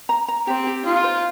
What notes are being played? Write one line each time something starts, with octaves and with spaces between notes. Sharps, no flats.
A#5
A#5
C4 G4
G4
D#4 F4
C5